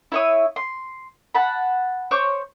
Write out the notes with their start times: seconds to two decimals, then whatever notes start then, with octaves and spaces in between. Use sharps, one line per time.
0.12 E4 C#5 D#6
0.56 C6
1.35 F#5 A5 B5
2.11 C5 C#5 C#6 D6